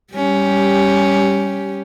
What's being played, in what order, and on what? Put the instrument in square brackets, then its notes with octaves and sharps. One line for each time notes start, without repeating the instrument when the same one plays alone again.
[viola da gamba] G3 C#4 G4